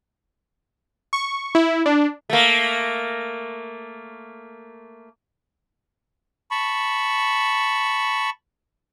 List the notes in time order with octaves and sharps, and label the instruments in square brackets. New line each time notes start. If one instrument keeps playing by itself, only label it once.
[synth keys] C#6
E4
D4
[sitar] A3 A#3
[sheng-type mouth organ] A5 B5 C#6